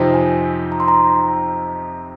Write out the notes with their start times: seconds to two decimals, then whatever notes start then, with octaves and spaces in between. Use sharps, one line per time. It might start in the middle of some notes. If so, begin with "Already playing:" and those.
Already playing: F2 C3 F3 C4 D#4
0.14 G#5
0.72 A#5
0.80 C6
0.88 A#5